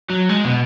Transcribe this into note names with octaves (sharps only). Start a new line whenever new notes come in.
F#3
G#3
B2